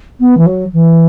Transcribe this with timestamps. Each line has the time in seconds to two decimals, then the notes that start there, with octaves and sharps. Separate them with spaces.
0.20 B3
0.37 E3
0.46 F#3
0.73 E3